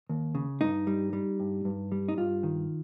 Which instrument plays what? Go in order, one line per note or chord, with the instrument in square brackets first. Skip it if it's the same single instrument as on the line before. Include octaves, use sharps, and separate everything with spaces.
[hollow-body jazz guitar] D#2
C#3
G2 D#4
G3
G3
G2
G2
G3
D#4
G2 F4
D#3